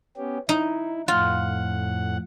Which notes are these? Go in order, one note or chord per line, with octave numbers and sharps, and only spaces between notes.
B3 C#4 G4
D#4 E4
F2 A2 F4 F#5